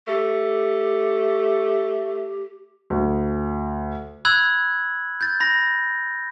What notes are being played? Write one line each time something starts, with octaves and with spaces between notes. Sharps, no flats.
A3 G4
D2
B5 E6 F#6 G#6 F#7
G6 A6
B5 A#6